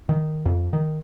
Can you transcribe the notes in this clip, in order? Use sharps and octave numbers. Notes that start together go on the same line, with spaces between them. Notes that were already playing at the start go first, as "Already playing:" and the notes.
D#3
F2
D#3